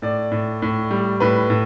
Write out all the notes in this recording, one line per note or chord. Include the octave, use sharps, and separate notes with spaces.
A2 D5
A2
A2
G3
A2 B4
A2